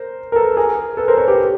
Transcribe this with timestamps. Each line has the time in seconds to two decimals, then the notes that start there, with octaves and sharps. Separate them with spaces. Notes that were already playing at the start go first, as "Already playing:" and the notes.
Already playing: A#4 C5
0.32 A#4
0.36 A4 B4
0.57 G#4 A#4
0.97 A4 B4
1.08 A#4 C5
1.18 B4 C#5
1.28 G4 A4